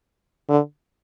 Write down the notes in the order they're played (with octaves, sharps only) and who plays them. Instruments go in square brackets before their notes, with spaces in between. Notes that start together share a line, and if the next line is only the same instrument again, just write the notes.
[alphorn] D3